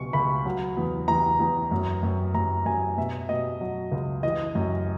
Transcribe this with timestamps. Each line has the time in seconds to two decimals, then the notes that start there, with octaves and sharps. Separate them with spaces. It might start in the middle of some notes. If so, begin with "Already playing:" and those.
Already playing: C#2 B2 F#3 C#6
0.13 C#2 B5
0.46 F#3
0.77 E2
1.08 E2 A#5
1.40 E2
1.71 F#2
2.03 F#2
2.34 F#2 A#5
2.66 F#2 G#5
2.97 B2 E5
3.29 B2 D#5
3.61 F#3
3.92 C#2
4.23 E3 D#5
4.55 F#2